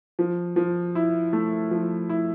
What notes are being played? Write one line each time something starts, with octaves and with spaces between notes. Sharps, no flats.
F3
F3
E4
A3
F3
E4